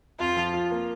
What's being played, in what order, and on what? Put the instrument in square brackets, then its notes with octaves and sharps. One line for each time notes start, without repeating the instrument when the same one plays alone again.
[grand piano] F2 [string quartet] F4
[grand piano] F3
F4
A#3